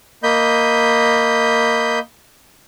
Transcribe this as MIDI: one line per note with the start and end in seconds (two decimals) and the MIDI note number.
0.23 1.99 58
0.23 1.99 75
0.23 1.99 83
0.23 1.99 91